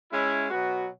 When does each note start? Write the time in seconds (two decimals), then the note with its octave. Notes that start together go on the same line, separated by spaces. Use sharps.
0.12 G#3 C#4 E4
0.49 B2 F#3 B3 F#4